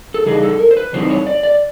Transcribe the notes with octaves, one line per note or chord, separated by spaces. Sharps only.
A4
C#3 E3 G3 D#4 G#4
A4
A#4
C5
B4
C#3 E3 G3 C4 D#4 C5
C5
C#5
D5
D5